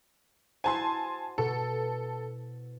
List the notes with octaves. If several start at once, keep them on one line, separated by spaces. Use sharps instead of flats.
E4 F#4 C5 G#5 A5 C6
B2 A4